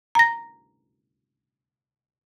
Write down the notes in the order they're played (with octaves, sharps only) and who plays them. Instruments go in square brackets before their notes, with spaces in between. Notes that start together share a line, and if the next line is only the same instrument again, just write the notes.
[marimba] A#5 A#6